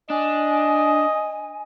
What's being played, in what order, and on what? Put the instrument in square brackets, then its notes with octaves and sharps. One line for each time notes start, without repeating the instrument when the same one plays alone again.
[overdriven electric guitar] D4 [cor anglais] D#5 [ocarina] G#5